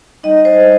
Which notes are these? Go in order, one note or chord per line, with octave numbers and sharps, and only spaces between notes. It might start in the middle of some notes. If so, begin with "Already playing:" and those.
G3 D#4 D#5
C5